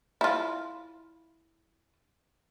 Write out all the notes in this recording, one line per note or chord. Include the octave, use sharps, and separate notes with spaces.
E4 F4